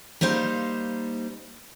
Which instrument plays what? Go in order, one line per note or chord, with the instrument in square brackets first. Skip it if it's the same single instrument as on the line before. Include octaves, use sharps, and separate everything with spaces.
[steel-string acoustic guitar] G3 A#3 D#4 C5 F5